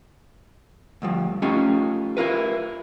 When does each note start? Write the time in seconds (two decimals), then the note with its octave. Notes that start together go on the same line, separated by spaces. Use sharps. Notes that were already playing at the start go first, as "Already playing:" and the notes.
1.02 D2 G2 F3
1.42 A3 C#4 D#4 F4 G4
2.17 E4 F4 A#4 B4